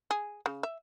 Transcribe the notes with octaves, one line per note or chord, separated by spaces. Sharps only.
G#4
C#3
E5